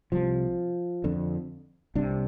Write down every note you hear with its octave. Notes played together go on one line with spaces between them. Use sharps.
C2 C3 F3
F2 D3
C2 C3 D4